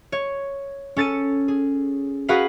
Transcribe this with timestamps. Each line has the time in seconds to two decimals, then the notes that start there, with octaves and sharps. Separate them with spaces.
0.12 C#5
0.96 C#4 A4 A6 C#7 D#7
1.48 G#4
2.28 F#4 G#4 A#4 B4 F5 F#5